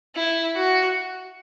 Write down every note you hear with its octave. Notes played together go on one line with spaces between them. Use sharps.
E4
F#4